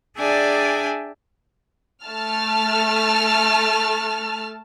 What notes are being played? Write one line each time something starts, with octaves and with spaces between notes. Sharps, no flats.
D4 G#4 D5 E5 G5 G#5
A3 A5 F6